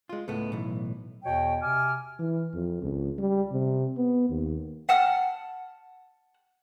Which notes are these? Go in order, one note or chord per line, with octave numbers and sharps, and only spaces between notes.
G#3 F4
C#2 A2 A3 B3
B1 A2 E3
E2 B2 C#5 G5
C3 G#5 D6 F6
E3
F2
C#2
G3
C3
B3
D#2
F#5 A5 F6